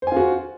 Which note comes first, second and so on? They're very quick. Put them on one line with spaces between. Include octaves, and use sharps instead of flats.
C5 G#5 F4 F#4